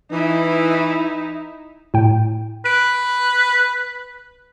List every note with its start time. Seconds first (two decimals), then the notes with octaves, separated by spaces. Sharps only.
0.11 E3 D#4 E4
1.94 A2 G5
2.65 B4 D7